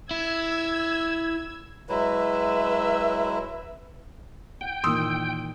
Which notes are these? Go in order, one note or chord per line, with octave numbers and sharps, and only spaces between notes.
E4 E6 G#6
F#3 G#3 E4 B4 E5
F#5 G5
A#2 D#3 E3 C6 D#6 E6